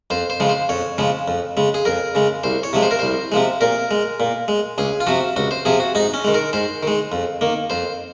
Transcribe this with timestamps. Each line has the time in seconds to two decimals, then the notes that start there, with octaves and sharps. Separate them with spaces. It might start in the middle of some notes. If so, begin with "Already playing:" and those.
0.10 F2 C5
0.30 C5
0.40 C#3 F3 G#3
0.49 C5
0.69 F2 C#5
0.98 C#3 F3 G#3
1.28 F2
1.57 C#3 G#3
1.74 G#4
1.85 F2 A#4
2.15 C#3 G#3
2.44 C2 C5
2.63 C#5
2.73 C3 F3 G#3
2.83 C5
2.91 A#4
2.99 C2 C5
3.32 C3 F3 G#3
3.61 A#2 A#4
3.91 G#3
4.20 A#2
4.48 G#3
4.78 C#2 G#4
5.00 F4
5.07 C3 F3 F#4
5.36 C#2 F#4
5.51 C5
5.65 C3 F3 G#4
5.80 F#4
5.95 G#2 D#4
6.14 C#4
6.24 D#3 G#3
6.34 A#4
6.53 G#2 C5
6.83 D#3 G#3
7.12 F2
7.41 D#3 A#3
7.70 F2 C5